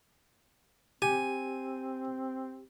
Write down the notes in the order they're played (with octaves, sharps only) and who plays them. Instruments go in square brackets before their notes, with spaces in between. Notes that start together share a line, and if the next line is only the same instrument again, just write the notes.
[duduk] C4 [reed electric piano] G4 [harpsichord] G#5